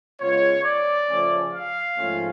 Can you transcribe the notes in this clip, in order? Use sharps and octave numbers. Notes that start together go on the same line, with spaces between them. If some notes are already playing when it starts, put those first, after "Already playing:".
C#3 G#3 B3 F4 C#5
D5
C#3 F3 A3 C#4
F5
G#2 F3 A3 C#4 F4